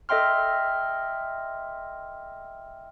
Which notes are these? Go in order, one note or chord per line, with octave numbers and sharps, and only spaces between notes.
A4 D#5 E5 G5 C6 F6